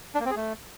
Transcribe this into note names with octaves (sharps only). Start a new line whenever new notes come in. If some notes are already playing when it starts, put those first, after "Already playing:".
D4
A#3
C4
G#4
A3